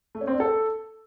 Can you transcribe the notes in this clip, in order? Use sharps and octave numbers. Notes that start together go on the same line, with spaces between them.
A3
C#4
C4
D4
A4